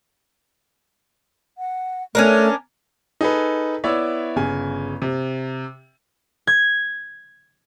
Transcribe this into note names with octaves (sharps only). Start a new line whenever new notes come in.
F#5
A3 C#4 D4 A#4
D#4 G#4 A4 B4
B3 E4 C#5 D5 E5
G1 C#3 G#5
C3
G#6